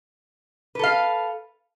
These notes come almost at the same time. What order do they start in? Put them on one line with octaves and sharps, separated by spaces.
B4 A4 F5